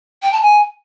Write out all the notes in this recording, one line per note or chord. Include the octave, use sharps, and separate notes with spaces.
G5
A5
G#5